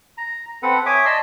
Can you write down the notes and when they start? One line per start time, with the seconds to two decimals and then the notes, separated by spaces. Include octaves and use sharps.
0.17 A#5
0.63 C4 A4 B4 F#5
0.86 C#5 E5 G#5 D6 D#6
1.05 D5 D#5 A5 C6 E6